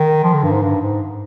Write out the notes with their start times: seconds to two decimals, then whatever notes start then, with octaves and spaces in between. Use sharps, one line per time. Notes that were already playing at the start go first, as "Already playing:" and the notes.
Already playing: D#3
0.24 F3
0.33 D3
0.43 G2
0.51 G#2
0.62 G2
0.81 G#2